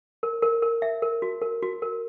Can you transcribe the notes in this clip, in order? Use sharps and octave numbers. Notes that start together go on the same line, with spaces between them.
A#4
A#4
A#4
E5
A#4
F#4
A#4
F#4
A#4